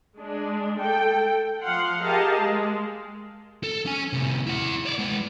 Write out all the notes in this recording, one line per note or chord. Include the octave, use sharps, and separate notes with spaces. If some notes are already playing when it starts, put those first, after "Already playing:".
G#3 D4
A4 G5
F3 F5 F#5 C6
G4 G#4 A#4 D#5 F5 A5
G#3
A4
C#4 G#5
A2 C3
E4 F#5
C#5 D5
G#3 B3